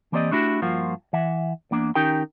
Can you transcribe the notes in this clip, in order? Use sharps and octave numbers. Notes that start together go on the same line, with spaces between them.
E3 A#3 C4 G4 D5 D#5
A3 D4 E4 F#4 G4
G2 F3 A#3 F4 F#4
E3 E5 F#5
E2 A#3 D4
D#3 C#4 D#4 G4 A#4 G5